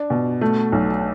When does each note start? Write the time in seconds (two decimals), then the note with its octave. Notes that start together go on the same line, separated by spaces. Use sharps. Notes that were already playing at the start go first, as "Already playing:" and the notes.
Already playing: D4
0.10 B2
0.41 A3
0.72 B1